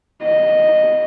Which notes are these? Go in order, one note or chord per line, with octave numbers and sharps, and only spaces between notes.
D#5